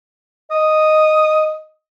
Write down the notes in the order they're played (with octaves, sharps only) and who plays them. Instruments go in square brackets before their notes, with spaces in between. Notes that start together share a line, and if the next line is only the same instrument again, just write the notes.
[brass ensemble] D#5 [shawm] D#6